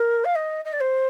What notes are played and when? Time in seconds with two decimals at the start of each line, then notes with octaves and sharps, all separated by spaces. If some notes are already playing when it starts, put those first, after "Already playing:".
Already playing: A#4
0.24 F5
0.35 D#5
0.65 D#5
0.73 D5
0.80 C5